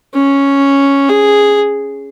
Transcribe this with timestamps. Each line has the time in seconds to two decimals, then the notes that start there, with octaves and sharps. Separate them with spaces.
0.14 C#4
1.09 G#4